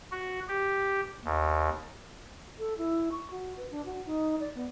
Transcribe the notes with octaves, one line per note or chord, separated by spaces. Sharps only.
F#4
G4
D#2
A4
E4
C#6
F#4
B4
D4
F#4
D#4
D5
B3